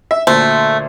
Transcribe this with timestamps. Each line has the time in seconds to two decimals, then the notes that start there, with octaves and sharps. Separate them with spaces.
0.11 E5
0.27 D2 A#2 A3 C5